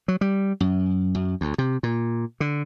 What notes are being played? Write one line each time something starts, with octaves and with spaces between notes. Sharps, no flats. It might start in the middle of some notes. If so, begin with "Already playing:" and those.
F#3
G3
F#2
F#2
D2
C3
A#2
D3